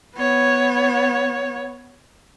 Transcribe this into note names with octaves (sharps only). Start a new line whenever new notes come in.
B3 C#5